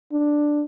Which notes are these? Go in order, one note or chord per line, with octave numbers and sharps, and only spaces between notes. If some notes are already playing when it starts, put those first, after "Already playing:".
D4